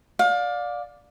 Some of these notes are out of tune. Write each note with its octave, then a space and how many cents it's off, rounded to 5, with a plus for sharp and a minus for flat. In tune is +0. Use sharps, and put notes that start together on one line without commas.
D5 +0 F5 +30